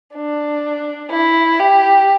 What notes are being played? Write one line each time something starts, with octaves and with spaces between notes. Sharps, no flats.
D4
E4
G4